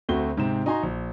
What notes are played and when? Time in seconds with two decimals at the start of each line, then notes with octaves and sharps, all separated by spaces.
0.09 D2 A3 C4 F#4 G7
0.37 G#2 C3 C4 E7
0.66 D#4 F#4 G#5 A#5 C6
0.83 A#1